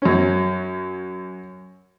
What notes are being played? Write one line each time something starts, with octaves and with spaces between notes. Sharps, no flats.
F#2 C#4